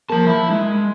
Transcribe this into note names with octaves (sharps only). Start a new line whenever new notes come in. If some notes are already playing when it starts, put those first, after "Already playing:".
F3 A#3 A5
E4
G#3